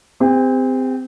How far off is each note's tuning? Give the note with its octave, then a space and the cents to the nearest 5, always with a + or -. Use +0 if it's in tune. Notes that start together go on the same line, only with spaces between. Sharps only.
C4 -25 G4 +45